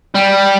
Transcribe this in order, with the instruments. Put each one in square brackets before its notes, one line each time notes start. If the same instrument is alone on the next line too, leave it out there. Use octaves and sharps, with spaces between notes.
[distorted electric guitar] G3